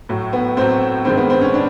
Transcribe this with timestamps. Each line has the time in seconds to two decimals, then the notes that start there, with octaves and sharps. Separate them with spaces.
0.09 A2 F#3
0.33 B3
0.57 A2 F#3 C4
1.05 G2 D#3 G#3 C4
1.17 B3
1.30 C4
1.41 C#4
1.54 D4